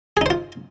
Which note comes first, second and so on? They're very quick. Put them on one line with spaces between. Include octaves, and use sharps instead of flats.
G#4 D#4 C5 F4